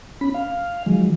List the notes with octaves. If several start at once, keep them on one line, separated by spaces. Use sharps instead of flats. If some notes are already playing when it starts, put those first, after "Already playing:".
C#4 B5
F5
D#3 F3 F#3 G#3